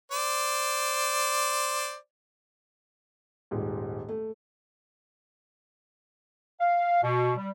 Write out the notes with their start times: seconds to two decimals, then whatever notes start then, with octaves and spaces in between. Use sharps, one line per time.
0.12 C5 D5
3.51 D#1 G#2
4.08 A3
6.60 F5
7.03 B2
7.37 G3